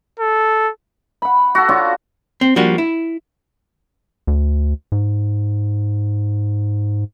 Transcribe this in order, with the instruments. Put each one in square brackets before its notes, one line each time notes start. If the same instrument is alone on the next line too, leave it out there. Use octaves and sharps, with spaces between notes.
[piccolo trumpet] A4
[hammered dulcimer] F#5 B5
F#4 A4
D4 F4 F#4 C#5
[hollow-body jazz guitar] C4
F3 G3 A#3 D4 F#4
E4
[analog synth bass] D2
G#2